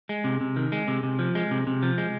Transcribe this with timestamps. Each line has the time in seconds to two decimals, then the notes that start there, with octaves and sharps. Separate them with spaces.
0.09 G#3
0.24 C3
0.41 C3
0.56 D#3
0.72 G#3
0.88 C3
1.03 C3
1.19 F3
1.35 G#3
1.51 C3
1.67 C3
1.83 F3
1.98 G#3